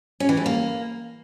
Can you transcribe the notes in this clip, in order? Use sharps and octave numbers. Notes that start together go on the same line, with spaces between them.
C#4
E3
A3
A#3